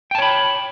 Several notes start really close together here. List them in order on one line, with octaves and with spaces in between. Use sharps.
G5 A5 C#5 B5